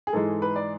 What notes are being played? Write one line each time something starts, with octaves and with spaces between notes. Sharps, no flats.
G#4
G#2 E3 G#3 A4
B4
D5